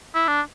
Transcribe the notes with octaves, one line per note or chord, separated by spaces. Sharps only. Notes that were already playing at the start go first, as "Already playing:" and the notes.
E4
D4